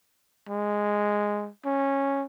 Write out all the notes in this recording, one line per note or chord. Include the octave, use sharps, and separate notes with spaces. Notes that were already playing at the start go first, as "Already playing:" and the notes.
G#3
C#4